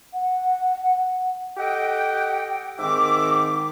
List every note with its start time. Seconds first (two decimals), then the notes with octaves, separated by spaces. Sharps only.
0.14 F#5
1.58 G4 A4 D#5 F#5 G5
2.79 G#2 D#3 C4 E5 D6